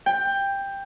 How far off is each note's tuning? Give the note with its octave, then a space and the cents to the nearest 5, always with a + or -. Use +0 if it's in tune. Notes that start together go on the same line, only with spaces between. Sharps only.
G5 +10